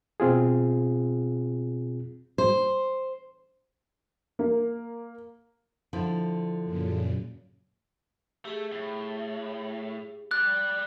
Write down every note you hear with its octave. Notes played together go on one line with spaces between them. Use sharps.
B2 C4 F4 G#4
C5
A#3
D3 F3 E4
F#2 A#2 C#3
A3 G4 G#4
A2
G3 D5 F#6